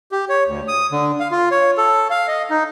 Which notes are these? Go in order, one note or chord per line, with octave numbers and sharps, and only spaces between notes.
G4
C#5
D2
D#6
D3
F5
F4
C#5
A4
F5
D#5
D#4